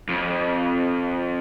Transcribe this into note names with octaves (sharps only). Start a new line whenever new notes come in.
F2